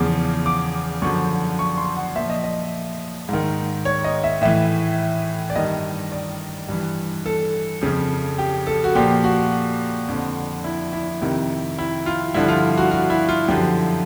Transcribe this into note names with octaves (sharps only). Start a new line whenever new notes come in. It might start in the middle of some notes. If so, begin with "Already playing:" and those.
Already playing: E2 C#3 F3 D6
D6
F#2 D3 F3 C#6
C#6
C6
F#5
A#2 F3 E5
D#5
D#5
G#2 D#3
C#5
D#5
E5
A2 E3 E5
D5
G2 D#3 D#5
D5
G2 E3
A4
F2 C#3 F3
G4
A4
F#4
A#2 F3 G4
F#4
F2 D3 F3
E4
E4
F2 C3 D#3
E4
F4
G2 D3 F3 E4
F4
F#4
F#4
E4
F4
F#2 D3 F3 G4